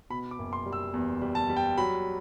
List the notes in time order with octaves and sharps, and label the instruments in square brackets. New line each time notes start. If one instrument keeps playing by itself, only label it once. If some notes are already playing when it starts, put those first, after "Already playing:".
[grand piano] B2 B5
D6
F#1
C6
G3
E6
E2
G3
A5
G3
G5
F#3 B5